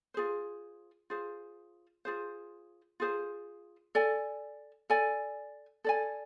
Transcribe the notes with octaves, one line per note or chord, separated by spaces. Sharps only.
F4 G#4 C5
F4 G#4 C5
F4 G#4 C5
F4 G#4 C5
A4 D5 G#5
A4 D5 G#5
A4 D5 G#5